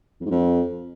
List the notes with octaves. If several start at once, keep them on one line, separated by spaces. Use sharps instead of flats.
F2
G#2
F2